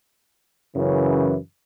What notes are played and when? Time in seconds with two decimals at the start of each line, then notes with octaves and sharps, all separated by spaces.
0.75 F#2 C#3 E3